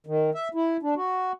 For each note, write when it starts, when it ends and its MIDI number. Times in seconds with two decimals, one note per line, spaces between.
0.07 0.30 51
0.35 0.48 76
0.54 0.77 64
0.83 0.94 62
0.96 1.32 66